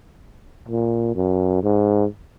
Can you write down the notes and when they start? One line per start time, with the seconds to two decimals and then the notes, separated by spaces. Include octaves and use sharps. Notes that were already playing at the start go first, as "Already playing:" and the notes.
0.69 A#2
1.16 F#2
1.63 G#2